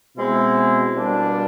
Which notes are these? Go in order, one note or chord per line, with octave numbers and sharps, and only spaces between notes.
B2 G#3 C4 E4
B2 G3 A#3 D4